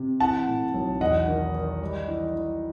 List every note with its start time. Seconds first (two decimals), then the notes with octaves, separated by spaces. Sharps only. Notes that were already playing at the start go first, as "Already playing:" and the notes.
Already playing: C3
0.20 E3 F#5 A5
0.48 A2
0.74 B1
1.01 E2 D#5 F#5
1.28 D#3
1.55 D#3
1.81 G3
2.08 E3
2.35 E3